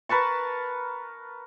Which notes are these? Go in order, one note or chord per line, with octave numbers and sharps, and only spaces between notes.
A#4 B4 A5 C#6